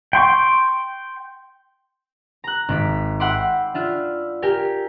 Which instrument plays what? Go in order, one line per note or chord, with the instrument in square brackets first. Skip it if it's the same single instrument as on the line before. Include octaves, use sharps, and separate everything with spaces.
[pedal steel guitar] G5 C6 C#6
[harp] A#5 F#6
G#1 D6 B6
E5 F#5 G5 B5 C6 D6
D4 F4 E5
G4 A#4 G5 G#5